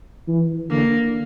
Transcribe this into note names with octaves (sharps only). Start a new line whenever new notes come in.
E3
D3 A#3